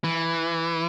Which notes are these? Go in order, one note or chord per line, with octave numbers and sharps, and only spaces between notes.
E3